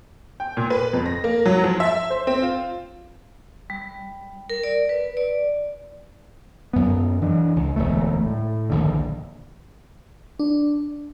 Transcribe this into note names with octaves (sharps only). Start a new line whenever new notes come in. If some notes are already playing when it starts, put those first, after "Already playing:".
G5
A#2
B4
F2
A#6
A#3
F#3
F3
E5
C5
C4
F4
G3
A#4
D5
B4
D5
F#2 B3
E3 D4
C#2
E1 D2 A3
A2
A#1 D#2 D3
D4